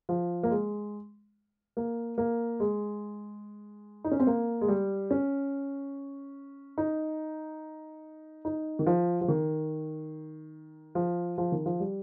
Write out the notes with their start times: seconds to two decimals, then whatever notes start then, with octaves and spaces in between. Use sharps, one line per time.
0.09 F3
0.43 A#3
0.51 G#3
1.77 A#3
2.18 A#3
2.60 G#3
4.04 D#4
4.11 C#4
4.20 C4
4.27 A#3
4.61 G#3
4.68 G3
5.11 C#4
6.78 D#4
8.45 D#4
8.79 D#3
8.87 F3
9.21 F3
9.28 D#3
10.95 F3
11.38 F3
11.52 D#3
11.66 F3
11.80 G3